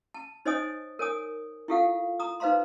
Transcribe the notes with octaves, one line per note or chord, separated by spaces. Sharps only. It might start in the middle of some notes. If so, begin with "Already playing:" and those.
A5
D#4 C5 C#5 D#5 G#5 D#6
A#4 C#5 G#5 D#6
E4 F4 G4 A4 F5 F#5
A#5 D#6
D#4 B4 C5 F5 A#5 C6